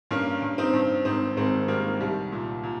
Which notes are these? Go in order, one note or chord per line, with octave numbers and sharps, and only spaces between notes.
G2 A#3 C#4
G2
C4 D#4
G2
G#1 C4 D#4
G#1 G#3 C4
D#3 G3 A#3
C2 G3
A#2
A#2